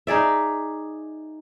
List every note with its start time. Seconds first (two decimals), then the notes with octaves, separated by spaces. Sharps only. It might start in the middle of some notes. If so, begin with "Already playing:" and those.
0.07 D#4 G#4 D5 E5